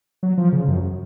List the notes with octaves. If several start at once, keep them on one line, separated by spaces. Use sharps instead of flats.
F#3
F3
C#3
F#2